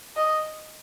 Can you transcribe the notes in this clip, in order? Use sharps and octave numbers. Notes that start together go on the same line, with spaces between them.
D#5